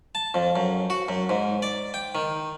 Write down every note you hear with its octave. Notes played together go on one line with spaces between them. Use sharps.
A5
F2
F#2
F#4
F#2
G#2
D5
G5
D#3